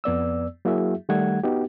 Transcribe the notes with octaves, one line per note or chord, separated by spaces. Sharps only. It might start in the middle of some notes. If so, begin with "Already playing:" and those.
F2 B3 D5 E6
F#3 A#3 E4 F#4 G#4 E5
D#3 G3 A3 F#5 G#6
B3 D#4 F#4 G4